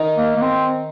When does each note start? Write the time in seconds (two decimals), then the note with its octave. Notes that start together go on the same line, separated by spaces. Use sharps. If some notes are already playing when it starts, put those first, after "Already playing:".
Already playing: D#3 D#4
0.17 A#3
0.36 A#3
0.42 C4